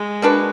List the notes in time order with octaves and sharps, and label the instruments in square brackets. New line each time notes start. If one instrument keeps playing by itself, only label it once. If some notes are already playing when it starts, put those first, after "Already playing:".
Already playing: [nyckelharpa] G#3
[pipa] A#3 D4 F#4 B4